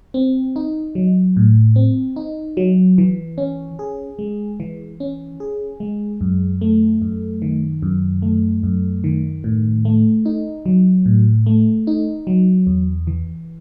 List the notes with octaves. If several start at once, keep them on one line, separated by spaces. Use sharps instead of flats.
C4
D#4
F#3
A2
C4
D#4
F#3
E3
C#4
G#4
G#3
E3
C#4
G#4
G#3
F#2
A3
F#2
D#3
F#2
A3
F#2
D#3
A2
A3
D#4
F#3
A2
A3
D#4
F#3
E2
E3